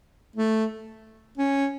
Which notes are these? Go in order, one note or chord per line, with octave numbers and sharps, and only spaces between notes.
A3
C#4